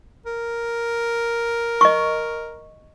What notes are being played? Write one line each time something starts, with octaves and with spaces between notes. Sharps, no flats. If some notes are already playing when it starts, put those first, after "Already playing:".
A#4
D#5 C#6